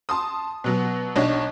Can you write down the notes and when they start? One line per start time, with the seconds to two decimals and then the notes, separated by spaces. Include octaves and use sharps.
0.09 A5 C6 D#6
0.64 B2 F#3 B3
1.16 B1 D4 C#5 D#5